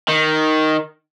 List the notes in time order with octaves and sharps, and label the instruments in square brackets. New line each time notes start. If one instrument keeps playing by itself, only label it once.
[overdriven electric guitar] D#3